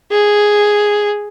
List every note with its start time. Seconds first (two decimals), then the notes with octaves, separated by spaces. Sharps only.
0.12 G#4